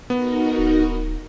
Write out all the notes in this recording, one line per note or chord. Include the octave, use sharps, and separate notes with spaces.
B3 D#4 F#4 A#4
D1